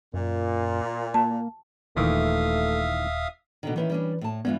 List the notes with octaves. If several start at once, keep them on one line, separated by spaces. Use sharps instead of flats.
F#2 A#2
A#3 A5
D#1 A#2 D#3 E3 A3 E5 F5 D#6
B2 D3 D#3
D#3 E3 C#4 E4 B4
G3 C#4 D4
A2 A5
G2 E3 G#3 B3 F4